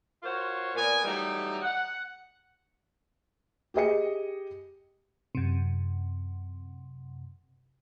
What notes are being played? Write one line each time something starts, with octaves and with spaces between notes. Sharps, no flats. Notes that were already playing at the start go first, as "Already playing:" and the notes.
F4 F#4 A#4 C5 C#5
A#2 B3 A#4 D5 G#5
E3 F#3 G3 A3 D#4
F#5
G4 G#4 D#5 C#7
F#2 C3